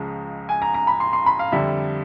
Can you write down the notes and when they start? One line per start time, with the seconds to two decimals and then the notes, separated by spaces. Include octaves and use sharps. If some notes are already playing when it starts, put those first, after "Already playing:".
Already playing: C#2 C#3 F3 G#3 A#5
0.49 G#5
0.62 A#5
0.74 A#5
0.87 B5
1.00 C6
1.13 C6
1.26 B5
1.39 F5
1.52 F2 D3 G3 E5